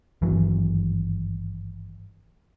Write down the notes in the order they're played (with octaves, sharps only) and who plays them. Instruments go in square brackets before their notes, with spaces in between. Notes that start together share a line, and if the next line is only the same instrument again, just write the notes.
[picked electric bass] G#1 G2 E3 F#3